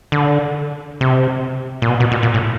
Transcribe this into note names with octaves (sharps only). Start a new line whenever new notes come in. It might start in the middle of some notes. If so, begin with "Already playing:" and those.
D3
C3
A#2
B2
B2
A#2
A#2
A2